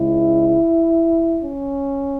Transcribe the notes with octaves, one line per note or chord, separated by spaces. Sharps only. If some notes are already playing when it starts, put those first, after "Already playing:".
Already playing: C#2 C#3 G#3 E4
C#4